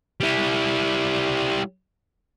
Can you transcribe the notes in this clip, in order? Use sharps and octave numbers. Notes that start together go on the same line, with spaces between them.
G3 E4